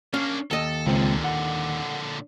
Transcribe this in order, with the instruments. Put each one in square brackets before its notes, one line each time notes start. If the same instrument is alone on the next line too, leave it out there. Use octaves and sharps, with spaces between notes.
[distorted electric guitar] A#3 D4 [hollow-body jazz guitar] C#4
[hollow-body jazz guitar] D#2 D#5 [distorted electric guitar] A4
[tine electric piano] C#2 C4 [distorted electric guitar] A#2 D3
[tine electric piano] F#5